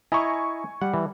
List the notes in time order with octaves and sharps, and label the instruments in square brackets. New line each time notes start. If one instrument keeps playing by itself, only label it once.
[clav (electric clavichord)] E4 D#5 A#5 [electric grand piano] G#5 C#6
[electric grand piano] G3 [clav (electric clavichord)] F#5
[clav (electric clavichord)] E3